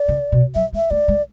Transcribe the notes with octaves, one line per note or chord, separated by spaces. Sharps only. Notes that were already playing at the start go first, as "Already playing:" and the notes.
Already playing: D5
C#3
B2
F#3 E5
G#3
E5
A3 D5
G#3